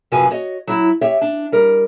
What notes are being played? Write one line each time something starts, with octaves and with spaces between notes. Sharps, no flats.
F#2 C3 F3 F#4 B4 G#5
F#4 C#5 D#5
F#3 E4
G4 C#5 E5
D4
G3 A#4